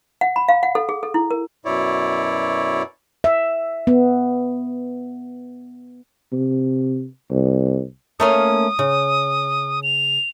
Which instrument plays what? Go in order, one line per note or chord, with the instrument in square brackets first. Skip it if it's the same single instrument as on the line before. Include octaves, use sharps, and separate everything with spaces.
[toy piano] F#5
B5
F5
F#5
A4
G#4
A4
E4
A#4
[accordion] F#2 B2 E4 C#5 D5
[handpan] E5
B3
[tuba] C3
C2
[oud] A3 A#3 C#4 [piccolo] D#6
[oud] C#3
[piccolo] F7